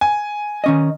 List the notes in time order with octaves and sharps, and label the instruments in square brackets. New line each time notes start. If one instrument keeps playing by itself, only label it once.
[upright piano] G#5
[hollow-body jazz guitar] D#3 C#4 D#5